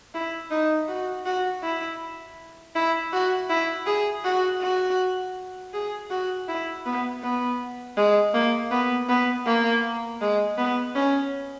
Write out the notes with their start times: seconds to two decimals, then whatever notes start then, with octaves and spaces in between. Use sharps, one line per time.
0.15 E4
0.51 D#4
0.88 F#4
1.26 F#4
1.63 E4
2.75 E4
3.13 F#4
3.49 E4
3.86 G#4
4.25 F#4
4.62 F#4
5.74 G#4
6.11 F#4
6.48 E4
6.86 B3
7.23 B3
7.97 G#3
8.34 A#3
8.72 B3
9.09 B3
9.46 A#3
10.21 G#3
10.58 B3
10.96 C#4